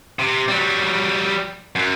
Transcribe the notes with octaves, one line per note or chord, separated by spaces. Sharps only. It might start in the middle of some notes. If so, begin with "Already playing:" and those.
C3
F#3 G3
F#2